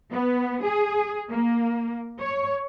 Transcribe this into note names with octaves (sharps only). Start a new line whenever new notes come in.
B3
G#4
A#3
C#5